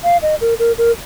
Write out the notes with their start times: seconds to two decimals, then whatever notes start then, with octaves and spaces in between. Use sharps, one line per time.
0.04 F5
0.22 D#5
0.41 A#4
0.59 A#4
0.78 A#4